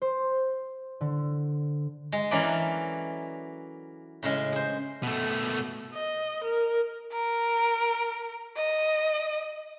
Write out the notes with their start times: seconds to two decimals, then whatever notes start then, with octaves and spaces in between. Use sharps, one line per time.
0.02 C5
1.01 D3
2.12 G#3
2.31 E3 F#3 A#3 C#4 A4 D5
4.23 A2 C#3 G#3
4.52 G#4 C5
5.03 B2 A3
5.94 D#5
6.44 A#4
7.13 A#4
8.57 D#5